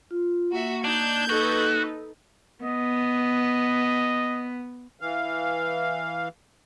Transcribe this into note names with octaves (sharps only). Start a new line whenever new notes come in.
F4
A#3 F#4 E5
D4 D#4 G6 G#6
D#4 F#4 A4 B4
B3 D#5
E3 F5